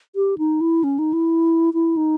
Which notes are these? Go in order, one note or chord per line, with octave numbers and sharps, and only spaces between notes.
G4
D#4
E4
C#4
D#4
E4
E4
D#4